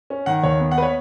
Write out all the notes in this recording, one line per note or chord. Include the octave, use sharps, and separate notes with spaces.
C#4
D#3 F#5
D#2 C#5
B3
F#5
B4
C#5